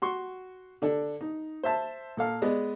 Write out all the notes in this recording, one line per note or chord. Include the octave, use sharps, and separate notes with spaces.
F#4 C6 C#6
D3 D4 A4
D#4
C5 E5 A5
A#2 A4 F5
G#3 B3 D5 D#5